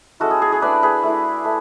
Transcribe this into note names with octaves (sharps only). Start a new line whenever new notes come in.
G#3 C#4 E4 F#4 A4
G#4
G#4
G#4
A3 D4 B4 D5
G#4 B4
A3 E4
A3